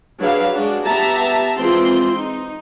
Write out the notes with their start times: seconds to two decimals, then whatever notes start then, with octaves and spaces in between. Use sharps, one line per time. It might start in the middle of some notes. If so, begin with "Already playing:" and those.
0.19 F#3 D4 G#4 B4 F5
0.52 G#3 D4 F#4
0.86 B3 G4 E5 A5 A#5
1.57 E3 G#3 C4 F4 C5 C6
2.15 D#4